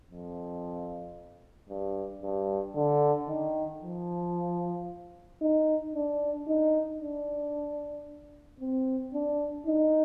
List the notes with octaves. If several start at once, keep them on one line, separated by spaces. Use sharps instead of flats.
F2
G2
G2
D3
D#3
F3
D#4
D4
D#4
D4
C4
D4
D#4